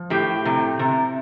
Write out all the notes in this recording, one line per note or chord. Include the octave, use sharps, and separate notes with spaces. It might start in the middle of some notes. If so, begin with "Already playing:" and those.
Already playing: F3
A2 G4
C3
C3